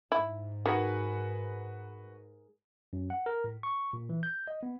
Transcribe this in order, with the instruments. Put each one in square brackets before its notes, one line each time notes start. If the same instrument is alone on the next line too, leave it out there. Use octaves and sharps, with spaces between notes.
[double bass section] G#2 [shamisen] E4
[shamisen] D#3 [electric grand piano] F#4 B4 F#5 [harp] G#4 A#4 G#5
[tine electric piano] F#2
F#5
A#4
A2
C#6
A#2
E3
G6
D#5
B3